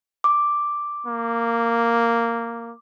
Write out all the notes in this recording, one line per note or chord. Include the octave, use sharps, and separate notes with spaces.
D6
A#3